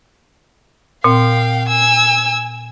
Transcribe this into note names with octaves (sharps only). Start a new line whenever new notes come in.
A#2 C4 F5 G5
G#5 E6